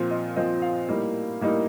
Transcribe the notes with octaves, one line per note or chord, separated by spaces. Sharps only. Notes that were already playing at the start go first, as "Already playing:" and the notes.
Already playing: A#2 F3 C4 F4 F5
D#5
A#2 F3 C4 F4 D#5
F5
A2 G3 A#3 D#4
A2 G3 A#3 D#4